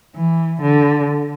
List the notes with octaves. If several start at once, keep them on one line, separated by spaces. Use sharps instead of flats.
E3
D3